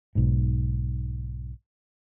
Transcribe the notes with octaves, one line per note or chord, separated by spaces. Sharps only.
B1 G#2